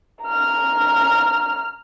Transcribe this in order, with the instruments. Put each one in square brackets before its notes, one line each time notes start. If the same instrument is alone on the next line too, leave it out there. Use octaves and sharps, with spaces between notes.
[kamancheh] A#5 F6